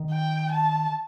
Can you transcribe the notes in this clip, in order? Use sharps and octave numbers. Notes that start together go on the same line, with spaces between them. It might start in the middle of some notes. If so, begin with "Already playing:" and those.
Already playing: D#3
G5
A5